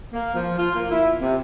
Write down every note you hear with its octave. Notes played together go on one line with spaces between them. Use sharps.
A#3
F3
F4
A#3
E4
C3